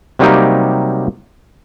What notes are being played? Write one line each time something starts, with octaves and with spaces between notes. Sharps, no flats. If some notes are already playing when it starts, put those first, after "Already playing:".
C3 F#3 G3 A#3 D#4 G4